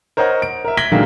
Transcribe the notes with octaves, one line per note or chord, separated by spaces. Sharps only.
A#4 C5 C#5 D#5 F#5 A#5
D7
A#4 E5
G#6 A#6 B6 D7 F#7 G7
A#2 D3 D#3 F#3 G#3 A#3